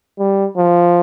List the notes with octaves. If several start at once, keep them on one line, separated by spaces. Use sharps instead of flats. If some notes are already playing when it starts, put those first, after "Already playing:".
G3
F3